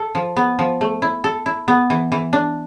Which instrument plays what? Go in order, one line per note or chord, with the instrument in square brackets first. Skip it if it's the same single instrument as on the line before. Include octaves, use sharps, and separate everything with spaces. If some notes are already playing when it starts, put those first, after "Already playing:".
Already playing: [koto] A4
F3
B3
F3
A3
E4
A4
E4
B3
E3
E3
D4